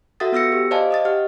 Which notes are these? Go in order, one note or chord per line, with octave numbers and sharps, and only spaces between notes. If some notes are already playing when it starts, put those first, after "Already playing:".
F#4 A4 E5 F#5 D#6 A6
B3 F4 E6 A#6 C#7
G4
C5 D5 D#5 F5 G#5 A5
D#5 D#6 A6
G4 F#5 F6